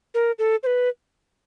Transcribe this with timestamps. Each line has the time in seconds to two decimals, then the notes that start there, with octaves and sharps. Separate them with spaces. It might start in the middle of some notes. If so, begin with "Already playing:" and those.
0.14 A#4
0.39 A4
0.63 C5
0.66 B4